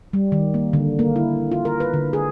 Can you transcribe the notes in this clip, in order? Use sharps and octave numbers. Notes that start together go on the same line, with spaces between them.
G3
D#3
A#3
D3
A#3
E4
F4
A#4
B4
D3
G#4